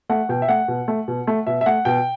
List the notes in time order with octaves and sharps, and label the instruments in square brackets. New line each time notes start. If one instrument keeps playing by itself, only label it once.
[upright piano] A3 F#5
B2 G5
E5
A3 F#5
B2
A3
B2
A3
B2 E5
E5
A3 F#5
B2 G5